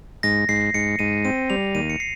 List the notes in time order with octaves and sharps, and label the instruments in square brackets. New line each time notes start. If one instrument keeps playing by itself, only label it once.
[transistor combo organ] G#2 [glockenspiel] A#6
[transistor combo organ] G#2 [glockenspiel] C7
[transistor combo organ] G#2 [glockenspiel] C#7
[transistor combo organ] G#2 [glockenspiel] D#7
[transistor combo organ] C4 [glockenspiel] D#7
[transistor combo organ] G3 [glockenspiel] F7
[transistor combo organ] D#2 [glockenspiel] D#7
[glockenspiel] C#7
C7